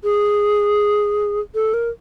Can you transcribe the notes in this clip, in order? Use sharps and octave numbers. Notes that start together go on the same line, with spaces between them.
G#4
A4
A#4